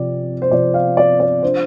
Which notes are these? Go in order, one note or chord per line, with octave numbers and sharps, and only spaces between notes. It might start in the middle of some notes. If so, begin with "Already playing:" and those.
Already playing: C3 F3 C4 D5
C5
C3 F3 C4 D5
F5
D5
D5
F3 D4 C5